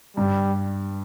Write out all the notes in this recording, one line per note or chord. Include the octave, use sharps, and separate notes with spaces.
G2 G3